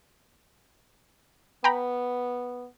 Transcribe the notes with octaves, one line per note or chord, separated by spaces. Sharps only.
B3 G5 A#5 B5